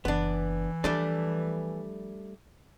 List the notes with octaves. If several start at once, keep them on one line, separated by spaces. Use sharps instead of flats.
F#1 E3 B3 D4
F3 G3 A3 D4